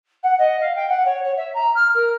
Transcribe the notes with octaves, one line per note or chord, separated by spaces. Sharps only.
F#5
D#5
F5
G5
F#5
C#5
C#5
E5
A#5
F6
A#4